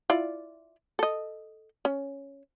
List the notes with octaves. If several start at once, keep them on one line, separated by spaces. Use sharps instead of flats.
E4 F4 D5
A4 D#5
C#4